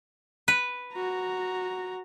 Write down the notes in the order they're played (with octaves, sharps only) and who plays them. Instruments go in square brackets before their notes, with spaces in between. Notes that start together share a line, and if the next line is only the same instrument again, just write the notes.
[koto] B4
[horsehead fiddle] F#4 A#5